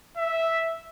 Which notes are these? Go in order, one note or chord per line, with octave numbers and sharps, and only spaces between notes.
E5